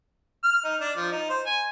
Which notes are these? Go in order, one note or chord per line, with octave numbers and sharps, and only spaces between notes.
F6
D#4
D4
F3
D#4
C5
G#5